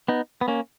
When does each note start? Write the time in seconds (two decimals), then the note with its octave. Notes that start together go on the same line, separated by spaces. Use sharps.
0.08 B3 D#4
0.41 B3
0.48 A#3 C#4